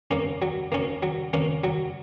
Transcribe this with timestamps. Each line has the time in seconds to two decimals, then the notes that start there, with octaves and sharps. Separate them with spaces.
0.11 A#3 C#4
0.42 F#3
0.72 A#3 C#4
1.03 F#3
1.33 A#3 C#4
1.64 F#3